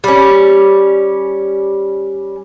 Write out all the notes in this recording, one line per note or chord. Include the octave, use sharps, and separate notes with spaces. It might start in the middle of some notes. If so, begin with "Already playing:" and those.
G3 C#4